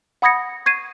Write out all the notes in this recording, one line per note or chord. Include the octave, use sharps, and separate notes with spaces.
F#5 B5 D#6 G#6 A#6 C#7
C#6 G#6 C7 D#7